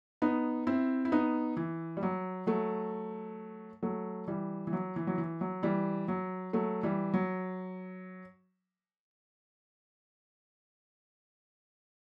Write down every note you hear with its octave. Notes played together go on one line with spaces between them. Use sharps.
B3 D#4
C4 E4
E4
B3 D#4
E3
G3
F#3
F#3 A3
F#3 A3
E3 G3
E3
F#3
E3
F#3
E3
F#3
E3 G3
F#3
F#3 A3
E3 G3
F#3